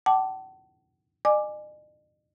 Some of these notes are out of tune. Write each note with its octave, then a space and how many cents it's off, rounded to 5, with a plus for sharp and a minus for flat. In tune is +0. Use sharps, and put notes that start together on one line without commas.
F#5 +45 A5 -10 D6 +0
D#5 -45 G#5 +0 D6 +5